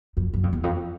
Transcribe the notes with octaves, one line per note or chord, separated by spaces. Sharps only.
F2
F#2
F2
E2
F2